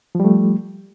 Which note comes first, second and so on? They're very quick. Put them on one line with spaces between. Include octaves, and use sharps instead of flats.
F3 G3 A3